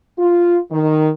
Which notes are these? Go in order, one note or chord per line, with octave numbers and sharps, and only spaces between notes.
F4
D#3